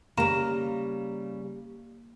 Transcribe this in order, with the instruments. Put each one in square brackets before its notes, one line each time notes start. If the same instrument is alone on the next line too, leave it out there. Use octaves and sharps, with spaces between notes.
[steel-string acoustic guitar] C#3 G3 [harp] A#3 A#5 E7